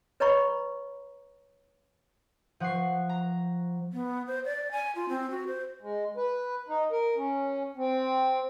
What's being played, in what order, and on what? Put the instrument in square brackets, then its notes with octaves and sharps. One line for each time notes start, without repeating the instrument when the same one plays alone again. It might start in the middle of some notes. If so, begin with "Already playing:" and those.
[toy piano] B4 C#5 D#5 A#5 B5 C#6
[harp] F3 F#5 C#6 C7
A#5
[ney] B3
C5
D5
G#5
F4
C4
F#4
C5
[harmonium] G#3
B4
D#4
A#4
C#4
C4